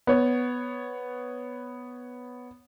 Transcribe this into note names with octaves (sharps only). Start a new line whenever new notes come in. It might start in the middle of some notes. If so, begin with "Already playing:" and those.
B3 C#5